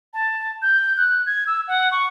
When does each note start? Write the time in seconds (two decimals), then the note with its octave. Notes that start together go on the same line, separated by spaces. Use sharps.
0.13 A5
0.62 G6
0.97 F#6
1.26 G#6
1.47 E6
1.68 F#5
1.91 C#6